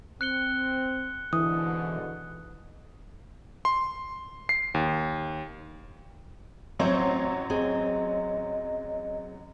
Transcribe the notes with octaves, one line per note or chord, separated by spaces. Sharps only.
C4 F#6 C#7 G7
G#2 B2 D3 E3 D#6
C6
C7
D#2
A1 F#3 C4 C5 C#5 E5
C4 G#4 D#5